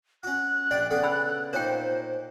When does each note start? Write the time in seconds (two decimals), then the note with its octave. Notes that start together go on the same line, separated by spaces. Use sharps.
0.23 C#4 F#4 F#6
0.71 A#1 D4 D5 G5
0.91 C#3 B3 G#4 A4
1.03 D4 B5 E6
1.53 A#2 D#3 A#3 C5 C#5 G5